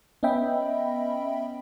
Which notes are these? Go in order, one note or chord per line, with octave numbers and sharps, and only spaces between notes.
B3 C#4 D#5 E5 G5 B5